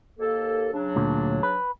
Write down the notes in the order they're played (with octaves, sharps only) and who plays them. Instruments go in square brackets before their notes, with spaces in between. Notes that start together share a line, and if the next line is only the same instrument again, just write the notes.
[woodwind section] D#2 A#3 A4
C#3 F#3 D4
[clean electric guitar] D2 A#2
B4